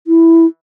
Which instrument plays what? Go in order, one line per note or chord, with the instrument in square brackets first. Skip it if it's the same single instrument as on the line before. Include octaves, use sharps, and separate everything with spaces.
[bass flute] E4